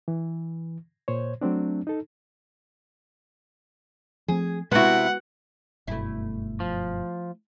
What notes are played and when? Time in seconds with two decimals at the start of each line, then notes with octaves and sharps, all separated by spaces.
0.08 E3
1.08 A#2 C5 C#5
1.41 F#3 A3 C4 D4
1.87 D#4 A4
4.28 F3 A3 C4 G#4
4.72 C3 G#3 B3 E4 F#4 F#5
5.87 F#1 G2 B2 A3 E4
6.60 F3